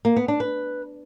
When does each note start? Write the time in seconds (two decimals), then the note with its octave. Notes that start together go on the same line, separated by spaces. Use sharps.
0.05 A#3
0.17 B3
0.28 D4
0.40 B4